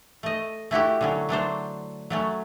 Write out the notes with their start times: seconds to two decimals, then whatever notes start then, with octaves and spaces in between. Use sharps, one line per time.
0.23 A3 D#5
0.71 A3 E4 F#4 G4
1.01 D3 F#3 C#4
1.29 F#3 A3 D4 C5
2.10 F#3 A3 C#4